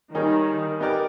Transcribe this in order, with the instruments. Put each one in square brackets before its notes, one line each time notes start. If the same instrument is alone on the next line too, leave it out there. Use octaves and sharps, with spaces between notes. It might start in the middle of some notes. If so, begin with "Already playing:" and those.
[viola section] D#3 [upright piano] G3 A#3 D#4 G#4 C#5
[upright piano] B3 D#4 G4 A#4 D5